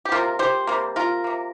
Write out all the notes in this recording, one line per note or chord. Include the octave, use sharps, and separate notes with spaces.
G4
C3 F3 A#3 F4 A#4
G4 C5
C3 G3 A#3
F4 A#4
C3 A#3